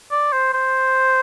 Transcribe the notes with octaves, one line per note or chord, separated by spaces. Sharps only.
D5
C5
C5